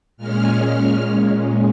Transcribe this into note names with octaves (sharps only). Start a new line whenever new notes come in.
A#2 G#3 C#4 F6
F6